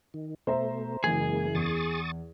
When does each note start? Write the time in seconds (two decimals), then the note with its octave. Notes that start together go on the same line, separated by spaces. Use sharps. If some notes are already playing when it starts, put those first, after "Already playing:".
0.14 D#3
0.47 B2 A3 C5 E5 A#5
1.04 F#1 E3 G#3 A#3 G#4 G#6
1.55 E2 C#6 D#6 A6